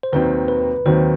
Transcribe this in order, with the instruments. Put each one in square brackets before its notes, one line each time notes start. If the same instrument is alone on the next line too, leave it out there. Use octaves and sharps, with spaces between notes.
[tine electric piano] C5
[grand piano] D#2 D#3 F#3 C4 [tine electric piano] B4
[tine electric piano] B4
[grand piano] D#2 D#3 F#3 C4 [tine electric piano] C5